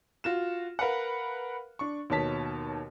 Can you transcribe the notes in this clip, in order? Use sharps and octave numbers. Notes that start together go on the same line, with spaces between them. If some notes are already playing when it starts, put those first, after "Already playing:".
F4 F#4 E7
A#4 B4 F5 F#5
D4 C#6
D#2 B2 C#5 A5 B6